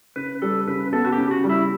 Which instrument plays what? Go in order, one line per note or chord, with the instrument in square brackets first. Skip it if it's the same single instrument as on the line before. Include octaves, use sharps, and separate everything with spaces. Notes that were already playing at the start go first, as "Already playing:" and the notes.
[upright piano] C#3 [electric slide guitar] B4
[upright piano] G3 [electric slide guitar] A4
[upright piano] C#3 [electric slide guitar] B4
[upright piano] B3 [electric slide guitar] A4
[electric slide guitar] F#4
G4
[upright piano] C#3
[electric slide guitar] F#4
[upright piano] G3
[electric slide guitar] E4